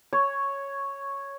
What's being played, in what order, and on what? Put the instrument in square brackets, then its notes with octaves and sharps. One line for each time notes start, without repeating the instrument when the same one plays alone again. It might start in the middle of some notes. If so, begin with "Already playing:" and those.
[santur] C#5